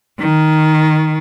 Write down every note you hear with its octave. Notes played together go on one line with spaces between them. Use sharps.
D#3